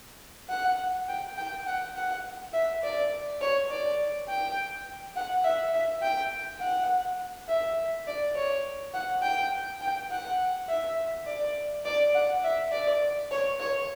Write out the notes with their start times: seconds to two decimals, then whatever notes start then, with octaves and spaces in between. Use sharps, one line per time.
0.49 F#5
1.08 G5
1.37 G5
1.66 F#5
1.95 F#5
2.53 E5
2.83 D5
3.41 C#5
3.70 D5
4.28 G5
5.16 F#5
5.44 E5
5.74 E5
6.02 G5
6.61 F#5
7.49 E5
8.07 D5
8.35 C#5
8.94 F#5
9.22 G5
9.81 G5
10.11 F#5
10.68 E5
11.26 D5
11.85 D5
12.14 F#5
12.44 E5
12.72 D5
13.31 C#5
13.60 C#5